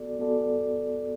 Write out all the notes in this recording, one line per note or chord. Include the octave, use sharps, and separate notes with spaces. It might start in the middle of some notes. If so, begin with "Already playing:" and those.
Already playing: B3 F#4 A4 D5
B3 F#4 A4 D5